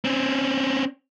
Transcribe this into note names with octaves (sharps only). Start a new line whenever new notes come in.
C4 C#4